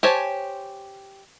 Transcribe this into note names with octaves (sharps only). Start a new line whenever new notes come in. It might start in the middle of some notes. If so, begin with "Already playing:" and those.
G4 C5 C#5 G#5 A5